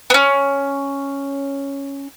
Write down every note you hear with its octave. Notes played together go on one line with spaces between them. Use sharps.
B3 C#4